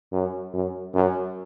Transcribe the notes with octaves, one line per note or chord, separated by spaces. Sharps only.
F#2
F#2
F#2